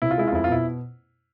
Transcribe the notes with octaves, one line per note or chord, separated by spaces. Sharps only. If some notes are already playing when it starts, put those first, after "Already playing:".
C3 E4
F4
G#3 E4
F4
F2 E4
F4
B2 E4